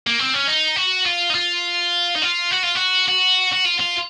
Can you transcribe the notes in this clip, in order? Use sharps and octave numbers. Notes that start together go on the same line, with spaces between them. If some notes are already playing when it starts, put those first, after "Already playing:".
A#3
C4
C#4
D#4
F#4
F4
D#4
F4
D#4
F4
F#4
F4
F#4
F#4
F#4
F4
F4